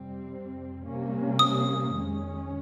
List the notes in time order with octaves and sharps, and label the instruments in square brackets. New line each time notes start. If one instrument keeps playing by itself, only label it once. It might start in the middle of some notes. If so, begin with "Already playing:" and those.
Already playing: [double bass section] F2 C3 G3 C4
C3 G3 A#3 C#4
[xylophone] D#6
[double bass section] F2 D#3 G#3 C#4